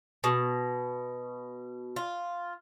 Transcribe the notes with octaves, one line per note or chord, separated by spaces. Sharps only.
B2
F4